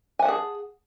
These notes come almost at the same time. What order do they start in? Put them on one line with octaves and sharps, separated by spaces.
G#5 F#5 A5 G#4